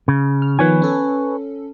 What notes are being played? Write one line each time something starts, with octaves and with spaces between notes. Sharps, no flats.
C#3
F6
D#3 F3 B3 B4 C#5 G#5
C#4 A4